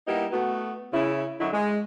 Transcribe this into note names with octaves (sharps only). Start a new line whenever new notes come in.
G3 A#3 B3 D#4 E4 G4
A3 B3 F#4
C#3 E4
F#2 D3 F#3 D#4 E4
G#3